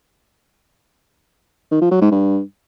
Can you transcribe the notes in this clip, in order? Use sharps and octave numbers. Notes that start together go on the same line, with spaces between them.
D#3
F3
F#3
G#2
G2